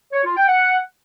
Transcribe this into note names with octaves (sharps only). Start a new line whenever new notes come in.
C#5
F4
G5
F#5